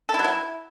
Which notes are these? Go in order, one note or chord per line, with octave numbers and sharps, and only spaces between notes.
A4
E4
F#3
E4